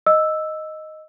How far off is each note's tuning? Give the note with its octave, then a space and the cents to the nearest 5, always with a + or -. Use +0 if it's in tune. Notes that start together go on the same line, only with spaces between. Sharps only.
D#5 +0 E6 +0